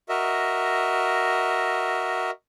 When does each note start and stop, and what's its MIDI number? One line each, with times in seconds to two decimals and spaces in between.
0.09 2.31 66
0.09 2.31 70
0.09 2.31 75
0.09 2.31 76